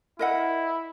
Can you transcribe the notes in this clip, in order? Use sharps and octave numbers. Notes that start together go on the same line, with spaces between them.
E4 A#4 D#5 F#5